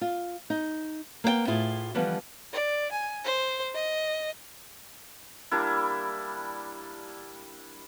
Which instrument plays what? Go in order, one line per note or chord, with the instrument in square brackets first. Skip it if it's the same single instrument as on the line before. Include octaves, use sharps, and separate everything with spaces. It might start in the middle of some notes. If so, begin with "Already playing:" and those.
[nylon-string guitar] F4
D#4
A#3 B3 A#4 G5
A2 E4 F4 G#4
D3 E3 F3 G3 B3
[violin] D5
G#5
C5
D#5
[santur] G3 A#3 D4 E4